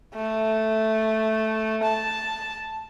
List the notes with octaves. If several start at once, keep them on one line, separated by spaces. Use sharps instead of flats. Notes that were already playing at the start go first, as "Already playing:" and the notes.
A3
A5